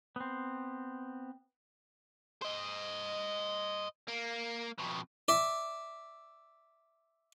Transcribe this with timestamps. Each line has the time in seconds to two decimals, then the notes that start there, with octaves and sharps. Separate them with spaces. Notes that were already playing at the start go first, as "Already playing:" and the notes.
0.16 B3 C4
2.42 C5 D#5
4.08 A#3
4.79 F2 B2
5.28 D5 E5